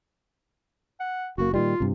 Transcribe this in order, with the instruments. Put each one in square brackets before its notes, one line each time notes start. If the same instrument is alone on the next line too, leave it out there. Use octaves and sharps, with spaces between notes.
[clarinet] F#5
[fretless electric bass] F#1 A#3 [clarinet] F#4
[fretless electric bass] A#2 D#3 G3 [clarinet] F4
[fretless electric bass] G2 C3